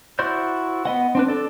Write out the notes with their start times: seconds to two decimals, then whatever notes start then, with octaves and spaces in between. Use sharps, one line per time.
0.19 E4 F#4 C5 D5 G6
0.85 B3 D#5 F#5
1.15 C4 D4 B4
1.28 D4 A4 D5